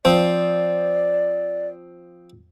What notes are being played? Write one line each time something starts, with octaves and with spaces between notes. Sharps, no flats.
F3 C4 D5